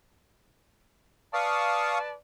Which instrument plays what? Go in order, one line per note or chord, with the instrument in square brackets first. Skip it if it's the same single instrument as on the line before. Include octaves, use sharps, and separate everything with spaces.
[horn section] B4 D5 A5 [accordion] F5 C#6 D#6